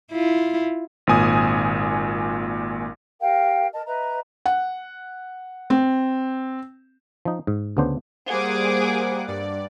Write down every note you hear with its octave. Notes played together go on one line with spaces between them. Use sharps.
E4 F4
G#1 A#2 G#5 D#6
G4 A#4 F5 G5
A#4 D#5 A5
B4 D#5 E5 A#5
F#5
C4
F3 D#4
G#2
D2 C#3 B3 D4 C5
G3 A#3 G#4 C5 F#5 D6
G2 D5